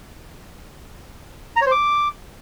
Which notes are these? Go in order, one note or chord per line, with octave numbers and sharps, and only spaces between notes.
A#5
C#5
C5
D6